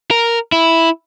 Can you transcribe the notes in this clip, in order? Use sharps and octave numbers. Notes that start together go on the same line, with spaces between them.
A#4
E4